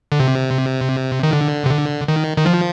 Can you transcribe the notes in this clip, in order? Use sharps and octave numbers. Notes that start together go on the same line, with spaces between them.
D3
C3
D#3
D3
C3
D3
D#3
D#3
F3